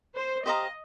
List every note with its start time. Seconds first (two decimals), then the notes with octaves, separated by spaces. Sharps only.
0.15 C5
0.44 G4 C5 D#5 F5 A#5